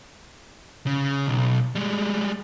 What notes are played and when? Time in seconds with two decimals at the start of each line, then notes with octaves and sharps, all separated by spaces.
0.86 C#3
1.26 B1
1.76 G3 G#3